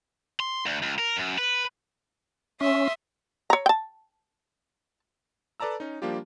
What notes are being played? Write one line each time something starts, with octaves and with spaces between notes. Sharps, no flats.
C6
D2
C#2
A#4
F#2
B4
C#4 E5 C6 D#6
C#5 A#5
G5 A5
A4 B4 D5 A5 A#5 E6
C#4 D#4
F3 G3 A#3 D4 F4 G4